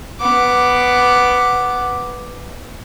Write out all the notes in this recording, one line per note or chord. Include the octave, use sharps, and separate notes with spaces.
B3 D6